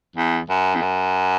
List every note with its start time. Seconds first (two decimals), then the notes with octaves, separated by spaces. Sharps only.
0.16 E2
0.49 F#2
0.75 E2
0.82 F#2